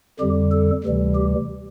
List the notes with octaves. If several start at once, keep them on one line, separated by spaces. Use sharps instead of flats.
F2 D3 G3 G4
A4
D2 C3 E3 G3
G4